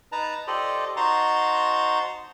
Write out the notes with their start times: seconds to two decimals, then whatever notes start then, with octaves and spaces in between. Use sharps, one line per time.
0.12 D#4 B4 A5 A#5
0.47 F4 G4 A4 C5 D5 D#5
0.97 D#4 F#4 C5 A5 A#5 C6